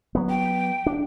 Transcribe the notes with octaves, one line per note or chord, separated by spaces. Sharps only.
F#3 B3
G5
D4